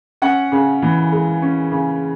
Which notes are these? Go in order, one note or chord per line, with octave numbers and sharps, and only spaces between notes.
C#4 F#5
C#3
E3
G#3
C#4
C#3